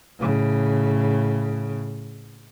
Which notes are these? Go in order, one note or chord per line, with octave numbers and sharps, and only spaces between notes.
A2 C#3